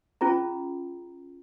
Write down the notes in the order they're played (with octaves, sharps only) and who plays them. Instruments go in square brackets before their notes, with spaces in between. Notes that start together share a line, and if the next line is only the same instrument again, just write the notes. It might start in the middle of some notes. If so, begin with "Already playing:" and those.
[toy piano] C#4 F4 G#4 A#5